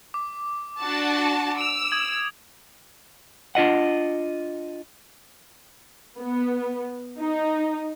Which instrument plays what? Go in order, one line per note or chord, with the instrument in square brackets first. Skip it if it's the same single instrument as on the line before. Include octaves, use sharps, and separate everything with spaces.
[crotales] D6
[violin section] D4 F#4 A5
[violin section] E6 [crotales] D7 F7
[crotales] D#6 G#6 F#7
[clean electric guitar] D4 F4 D#5 F#5
[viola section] B3
D#4